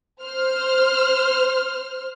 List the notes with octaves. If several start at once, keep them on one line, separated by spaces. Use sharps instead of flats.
C5 F6